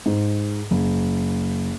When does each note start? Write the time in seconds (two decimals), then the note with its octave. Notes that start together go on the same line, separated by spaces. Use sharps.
0.06 G#2
0.71 F#1